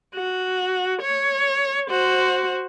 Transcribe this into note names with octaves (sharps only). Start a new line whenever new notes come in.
F#4
C#5
F#4 C5